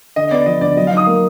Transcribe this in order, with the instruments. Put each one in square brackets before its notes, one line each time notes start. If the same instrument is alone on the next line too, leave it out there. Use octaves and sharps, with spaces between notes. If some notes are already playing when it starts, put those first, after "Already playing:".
[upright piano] D3 [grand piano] D#5
[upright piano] B3 [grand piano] D5
[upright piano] F3 [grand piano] D#5
[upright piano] D2 [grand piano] D5
[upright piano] F#3 [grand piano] D#5
[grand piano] F5
[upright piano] D#4 [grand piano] D#6
[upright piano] A#3